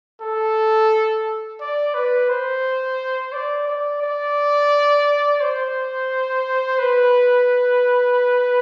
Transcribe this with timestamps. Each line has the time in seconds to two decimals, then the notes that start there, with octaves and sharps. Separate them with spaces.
0.21 A4
1.61 D5
1.94 B4
2.29 C5
3.33 D5
3.68 D5
4.02 D5
5.41 C5
6.79 B4